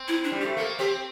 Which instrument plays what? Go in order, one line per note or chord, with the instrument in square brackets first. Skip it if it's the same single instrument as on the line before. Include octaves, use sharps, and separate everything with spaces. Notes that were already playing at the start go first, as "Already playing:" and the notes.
Already playing: [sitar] C4
[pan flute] E4
D4
[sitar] G3
[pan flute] G4
[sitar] A3
[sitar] A#3 [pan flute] A4
[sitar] C4 [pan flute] G4